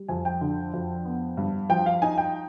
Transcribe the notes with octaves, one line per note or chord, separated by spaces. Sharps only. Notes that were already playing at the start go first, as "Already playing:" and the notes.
Already playing: G3
F2 G#5
G5
D3
F2
B3
G2
F3 G5
F5
D#4 G#5
G5